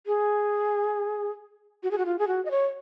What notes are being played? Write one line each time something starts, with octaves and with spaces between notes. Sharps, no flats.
G#4
F#4
G#4
F#4
F4
G#4
F#4
D#5
C#5